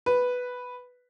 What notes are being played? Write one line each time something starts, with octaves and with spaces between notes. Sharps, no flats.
B4